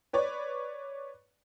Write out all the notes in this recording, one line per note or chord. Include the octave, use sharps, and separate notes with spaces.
B4 C#5 D5